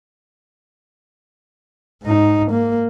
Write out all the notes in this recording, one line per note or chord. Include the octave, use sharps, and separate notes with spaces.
G#2 D#4
A#3